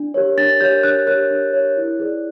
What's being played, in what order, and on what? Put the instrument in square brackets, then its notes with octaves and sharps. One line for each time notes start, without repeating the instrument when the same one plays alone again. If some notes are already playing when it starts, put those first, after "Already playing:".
Already playing: [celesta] D4
G4 A#4 C#5
D4 A6
G4 A#4 C#5 G6
D4 F#6
G4 A#4 C#5 F#6
D4
G4 A#4 C#5
E4
G#4 B4 D5